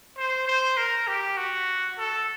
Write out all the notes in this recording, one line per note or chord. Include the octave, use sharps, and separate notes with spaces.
C5
C5
A#4
G4
F#4
A4